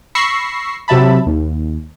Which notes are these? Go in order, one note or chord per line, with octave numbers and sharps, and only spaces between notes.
B5 C#6 E6 A#6 C7
C3 F#3 E5 A5 B5
D#2